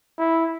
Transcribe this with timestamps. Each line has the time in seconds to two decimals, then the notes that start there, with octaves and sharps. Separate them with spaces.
0.18 E4